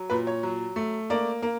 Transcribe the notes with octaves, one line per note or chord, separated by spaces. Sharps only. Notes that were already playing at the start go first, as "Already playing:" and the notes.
Already playing: F#3
A#2 B4
C#5
F#3
A3
A#3 D5
A#3